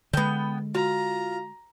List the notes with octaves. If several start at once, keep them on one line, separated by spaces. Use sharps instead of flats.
D3 G#3 B3 G5
F4 F#4 A#5